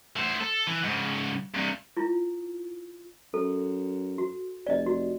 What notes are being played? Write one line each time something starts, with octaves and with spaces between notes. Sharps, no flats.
A3 C5
A4
E3
G#2 C#3
G2 C3
E4 F4
F#2 A4
F#4
F1 D5 D#5
F#4